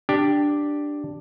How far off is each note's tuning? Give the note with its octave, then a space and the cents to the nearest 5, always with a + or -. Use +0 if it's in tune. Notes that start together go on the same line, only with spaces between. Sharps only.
D4 +0 G4 +0